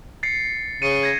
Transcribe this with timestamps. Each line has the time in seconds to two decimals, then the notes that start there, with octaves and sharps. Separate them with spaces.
0.23 A6 C7 C#7
0.82 C#3 C#7 D#7
1.03 G#6 A#6